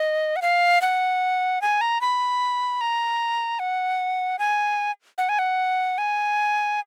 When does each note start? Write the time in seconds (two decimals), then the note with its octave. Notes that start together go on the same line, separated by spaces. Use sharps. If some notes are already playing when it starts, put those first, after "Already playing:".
Already playing: D#5
0.36 F#5
0.42 F5
0.81 F#5
1.62 G#5
1.81 A#5
2.01 B5
2.81 A#5
3.59 F#5
4.39 G#5
5.18 F#5
5.29 G#5
5.39 F#5
5.98 G#5